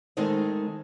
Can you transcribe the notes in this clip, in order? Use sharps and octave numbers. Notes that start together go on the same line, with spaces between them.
D#3 G#3 A3 C4 D#4 C5